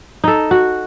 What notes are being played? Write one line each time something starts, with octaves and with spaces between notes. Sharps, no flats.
D#4 A4
F#4